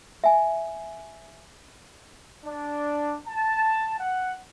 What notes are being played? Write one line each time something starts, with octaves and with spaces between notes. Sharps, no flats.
E5 G#5
D4
A5
F#5